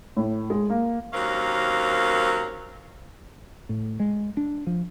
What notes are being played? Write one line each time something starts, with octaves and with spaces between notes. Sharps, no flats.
A2
G#3
A#3
D#2 F#3 C4 C#4 A#4 F5
A2
G#3
D4
F3